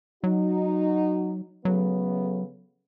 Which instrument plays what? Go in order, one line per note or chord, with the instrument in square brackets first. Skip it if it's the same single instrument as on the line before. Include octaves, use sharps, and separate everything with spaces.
[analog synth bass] F#3 [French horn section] D#4 F#4
[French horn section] C#3 A3 B3 [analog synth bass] F#3